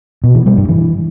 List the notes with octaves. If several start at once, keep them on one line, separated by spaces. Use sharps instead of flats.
B2
E3
G3
G2
E3